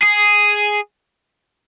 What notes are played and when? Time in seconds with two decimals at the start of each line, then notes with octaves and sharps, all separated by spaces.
0.03 G#4